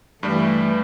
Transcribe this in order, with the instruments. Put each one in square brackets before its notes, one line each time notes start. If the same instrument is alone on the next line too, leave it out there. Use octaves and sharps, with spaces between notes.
[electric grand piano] G2 G3 [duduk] E3 [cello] A3